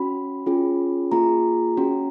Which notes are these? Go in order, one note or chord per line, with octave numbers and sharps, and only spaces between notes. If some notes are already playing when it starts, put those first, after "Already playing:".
Already playing: C#4 F#4 B5
C#4 F4 G#4
A#3 F4 G#4 A#5
C#4 F#4